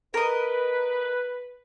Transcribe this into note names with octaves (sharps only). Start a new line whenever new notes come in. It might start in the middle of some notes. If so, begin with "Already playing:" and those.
A#4 B4 D#5